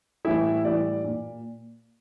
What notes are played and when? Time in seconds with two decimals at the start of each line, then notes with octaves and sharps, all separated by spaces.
0.24 A2 E3 G3 E4 E5
0.64 A2 E3 G3 D5
1.04 A#2